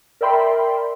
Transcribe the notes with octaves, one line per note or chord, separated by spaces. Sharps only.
A#4 D5 E5 G5 B5 C6